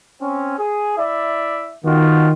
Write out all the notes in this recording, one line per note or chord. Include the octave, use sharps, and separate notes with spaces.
C4 C#4
G#4
E4 D5 E5
D#3 B3 F4 F#4